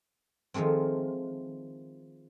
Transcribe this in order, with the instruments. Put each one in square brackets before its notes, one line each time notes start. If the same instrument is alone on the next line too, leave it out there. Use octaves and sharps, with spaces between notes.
[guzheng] D#3 F3 G#3 A3 C4